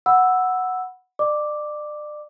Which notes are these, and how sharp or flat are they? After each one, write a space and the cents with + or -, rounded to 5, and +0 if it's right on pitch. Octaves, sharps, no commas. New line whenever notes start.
F#5 +0 B5 +0 E6 +0
D5 +30 D6 +0